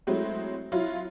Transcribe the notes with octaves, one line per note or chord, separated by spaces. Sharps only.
F#3 G#3 A3 C4 E4
F#3 E4 F4